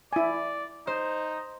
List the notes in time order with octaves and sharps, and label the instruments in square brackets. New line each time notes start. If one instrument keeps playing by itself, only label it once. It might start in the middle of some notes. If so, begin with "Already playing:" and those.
[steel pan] E4 G#5 [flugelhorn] D5
[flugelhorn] D#4 [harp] C5